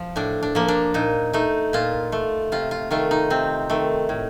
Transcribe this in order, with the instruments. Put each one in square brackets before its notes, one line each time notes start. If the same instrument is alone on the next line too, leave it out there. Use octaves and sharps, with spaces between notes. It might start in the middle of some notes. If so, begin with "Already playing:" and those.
Already playing: [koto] F3
A2 D4
D4
F3 A#3
D4
A#2 D#4
A3 D#4
A#2 F4
A3
C3 F4
F4
D#3 A3 F4
D#4
C3 C4
D#3 A3
A2